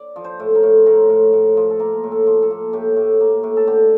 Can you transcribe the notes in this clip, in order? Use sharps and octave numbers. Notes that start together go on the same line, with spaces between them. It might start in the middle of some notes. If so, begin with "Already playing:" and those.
Already playing: D5
F3
C5
A2
A#4
A2
A2 A#4
A2
A2
F3
A4
A#3 A#4
A2
A4
F3
A4
A#3
A2 G4
A2
A#3
A2
A4
D3 G4